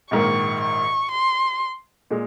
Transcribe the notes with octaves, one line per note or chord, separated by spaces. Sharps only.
A#1 G#2 D#3 A#3 C#6
C#6
C6
A#2 G#3